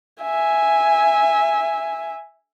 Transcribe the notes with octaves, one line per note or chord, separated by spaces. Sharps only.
E5 G#5